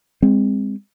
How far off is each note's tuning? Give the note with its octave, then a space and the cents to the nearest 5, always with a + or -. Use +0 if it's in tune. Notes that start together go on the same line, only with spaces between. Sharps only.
G#3 -30 C4 +0